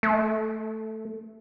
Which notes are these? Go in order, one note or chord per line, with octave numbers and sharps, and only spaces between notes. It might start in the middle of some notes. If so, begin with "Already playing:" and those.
A3